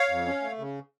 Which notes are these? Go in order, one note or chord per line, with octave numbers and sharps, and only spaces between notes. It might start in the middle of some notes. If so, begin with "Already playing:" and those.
Already playing: C#5 F5
F2
C#4
A3
C#3